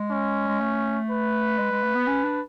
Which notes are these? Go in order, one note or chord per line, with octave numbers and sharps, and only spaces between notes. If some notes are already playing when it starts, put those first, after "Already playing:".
Already playing: G#3
C#4
G#3
A3
B4
G#3
G#3
A3
B3
C#4
D4